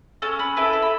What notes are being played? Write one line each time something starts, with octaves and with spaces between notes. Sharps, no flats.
C#4 A4
B4
E4 A4 B4
B4
B5